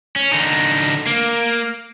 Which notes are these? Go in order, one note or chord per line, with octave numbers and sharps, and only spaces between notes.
C#4
D3 D#4
A#3